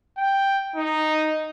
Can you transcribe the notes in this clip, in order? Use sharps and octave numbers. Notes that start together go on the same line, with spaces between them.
G5
D#4